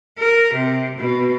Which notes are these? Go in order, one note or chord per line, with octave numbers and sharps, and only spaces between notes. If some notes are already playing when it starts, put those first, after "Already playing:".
A#4
C3
B2